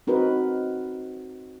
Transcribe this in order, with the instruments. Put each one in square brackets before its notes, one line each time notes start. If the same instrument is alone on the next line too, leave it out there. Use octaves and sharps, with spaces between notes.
[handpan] C4 D#4 F#4 A#4 B4